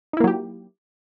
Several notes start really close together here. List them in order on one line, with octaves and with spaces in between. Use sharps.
D#4 E4 A#3 F#3 G4